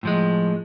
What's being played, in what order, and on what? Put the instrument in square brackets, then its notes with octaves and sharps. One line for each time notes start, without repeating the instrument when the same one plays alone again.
[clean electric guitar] A2 F3 G#3